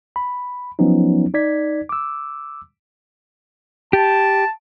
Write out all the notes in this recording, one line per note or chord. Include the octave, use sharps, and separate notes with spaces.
B5
F3 F#3 B3 C#4 D#4
D#4 D5 G#6 B6
D6 E6
G4 A5